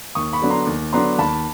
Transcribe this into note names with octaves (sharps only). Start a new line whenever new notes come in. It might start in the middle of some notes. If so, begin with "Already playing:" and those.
D#2 C#6 D#6
B5 C#6
D3 F#3 B3 D4
A#5 C6
D#2
D3 F#3 B3 D4 A#5 C6
D#2 A5 B5